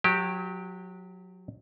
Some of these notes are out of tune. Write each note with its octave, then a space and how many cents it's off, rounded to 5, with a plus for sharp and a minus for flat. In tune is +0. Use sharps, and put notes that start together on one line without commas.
F#3 -25 G4 +0